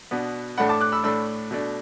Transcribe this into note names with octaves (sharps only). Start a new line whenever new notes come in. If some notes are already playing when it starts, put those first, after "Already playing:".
B2 B3 D4
A2 A3 D4 F#5 B5
A5 D6
D6 F#6
B5 E6
A2 A3 D4 B5 E6
B2 A3 D4